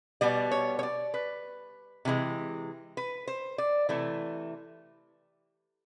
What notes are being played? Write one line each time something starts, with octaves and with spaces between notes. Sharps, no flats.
B2 G3 B3 D5
C#5
C#5
D5
B4
C3 E3 G#3
B4
C5
D5
C3 E3 A3